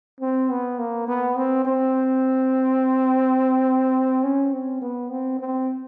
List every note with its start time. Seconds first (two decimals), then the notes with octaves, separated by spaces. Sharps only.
0.20 C4
0.50 B3
0.79 A#3
1.08 B3
1.36 C4
1.65 C4
4.23 C#4
4.53 C4
4.81 B3
5.10 C4
5.39 C4